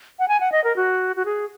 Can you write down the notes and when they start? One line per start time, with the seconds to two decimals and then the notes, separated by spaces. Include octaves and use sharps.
0.19 F#5
0.28 G#5
0.40 F#5
0.52 D#5
0.64 A#4
0.76 F#4
1.16 F#4
1.25 G#4